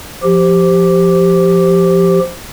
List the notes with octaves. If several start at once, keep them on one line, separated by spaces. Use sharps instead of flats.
F3 G4